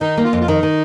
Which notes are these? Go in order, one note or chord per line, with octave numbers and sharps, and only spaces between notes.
D#3 D#4
A#3
F4
F2
F4
D#3 D#4
D#3